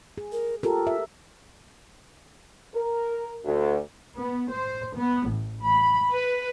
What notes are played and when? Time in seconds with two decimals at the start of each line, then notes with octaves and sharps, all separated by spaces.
0.18 G#4
0.32 A#4
0.63 F4 G4 A4 A#4
0.87 E5
2.75 A#4
3.45 D2
4.18 B3
4.51 C5
4.97 B3
5.30 A1
5.62 B5
6.11 B4